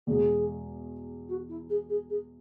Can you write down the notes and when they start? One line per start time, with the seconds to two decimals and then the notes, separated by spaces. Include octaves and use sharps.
0.07 E2 B2 G#3 G#4
1.28 F#4
1.49 E4
1.69 G#4
1.89 G#4
2.10 G#4